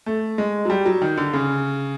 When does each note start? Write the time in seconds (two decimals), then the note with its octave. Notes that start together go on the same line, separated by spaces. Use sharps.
0.06 A3
0.38 G#3
0.65 F#3
0.70 G3
0.86 F#3
1.02 D#3
1.18 D3
1.33 C#3